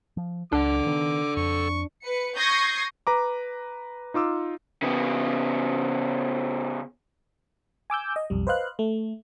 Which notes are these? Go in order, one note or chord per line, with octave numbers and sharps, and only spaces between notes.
F3
C#2 D4 A4 F#5 D6
D#3 B3
F2 C#6
B4 C#7
C#6 D#6 G6 G#6 A#6 C7
B4 A#5 D6
D#4 F4 D6 E6
C#3 B3
G#5 D6 E6 G6
D#5
B1 F2 G3
B4 C5 D#5 F5 F#6
A3